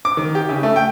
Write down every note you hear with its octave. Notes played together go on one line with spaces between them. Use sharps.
D6
D#3
G4
C#3
A3
G5